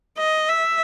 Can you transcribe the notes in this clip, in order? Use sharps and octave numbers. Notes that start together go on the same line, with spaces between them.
D#5
E5